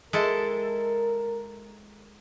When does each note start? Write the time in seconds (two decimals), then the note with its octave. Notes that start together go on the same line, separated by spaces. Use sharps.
0.13 G#3 E4 A4 A#4